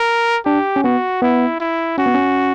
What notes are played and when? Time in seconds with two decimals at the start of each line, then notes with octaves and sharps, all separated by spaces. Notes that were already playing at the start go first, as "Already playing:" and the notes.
Already playing: A#4
0.46 D4 G4
0.76 C#4
0.84 B3 F#4
1.22 B3 E4
1.60 E4
1.98 C#4 F#4
2.06 B3
2.14 C#4